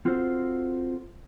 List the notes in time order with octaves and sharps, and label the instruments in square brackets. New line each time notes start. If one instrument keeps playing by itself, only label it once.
[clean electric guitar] C4 F4 F#4 A4 C5